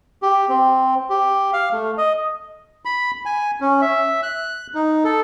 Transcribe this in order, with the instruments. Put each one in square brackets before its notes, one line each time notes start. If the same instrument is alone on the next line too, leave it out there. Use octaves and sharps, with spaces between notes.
[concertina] G4
C4
G4
F5
A3
D#5
[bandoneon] B5
G#5
C#4
E5
F#6
D#4
A4